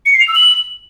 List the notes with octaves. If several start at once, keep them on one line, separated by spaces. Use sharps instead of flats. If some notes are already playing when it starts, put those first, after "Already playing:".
C#7
C7
F7
E6
F#7